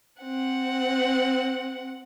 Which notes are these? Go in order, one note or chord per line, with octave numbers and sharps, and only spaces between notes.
C4 F#5